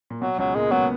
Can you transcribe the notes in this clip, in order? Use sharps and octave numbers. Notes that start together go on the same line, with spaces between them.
A#2
B2 F#3
C#2 C#3 F#3
A#2 G#3 A#3
B2 F#3 B3